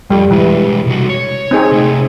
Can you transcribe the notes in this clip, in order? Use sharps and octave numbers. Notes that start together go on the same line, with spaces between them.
F2 G3
B2 E3 G#3
C2 F#4
C#5
C4 D#4 G#4
C3 A3